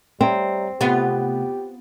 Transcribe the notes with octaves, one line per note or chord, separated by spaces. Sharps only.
G3 C4 C#5 E5 A#5
C3 A3 B3 F4 G4